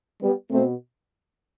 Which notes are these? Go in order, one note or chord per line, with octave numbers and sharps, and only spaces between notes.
G3 B3
B2 A3 C4